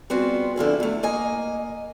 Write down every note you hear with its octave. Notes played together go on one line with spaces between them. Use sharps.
G3 B3 C4 F4 F#4 G#4
D3 F3 E4 G#4
E2 A3
A#3 D#5 G#5